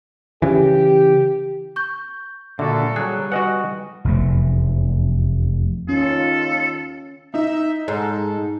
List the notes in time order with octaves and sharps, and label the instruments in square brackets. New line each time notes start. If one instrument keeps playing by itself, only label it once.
[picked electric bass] C#3 E3 [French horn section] G4
[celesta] C#6 G6
[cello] A#2 A4 [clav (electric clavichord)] D3 F#4 [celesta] E5
[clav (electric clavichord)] F#3 G#4 [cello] G3 [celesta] F#6
[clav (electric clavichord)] F#4 D#5 F#5 [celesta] B4 G#5 D#6
[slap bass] F1 E2 A3
[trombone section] D#2 F4 [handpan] C#4 [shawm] A4
[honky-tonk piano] D#4 [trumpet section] E5
[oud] G#2 [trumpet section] A4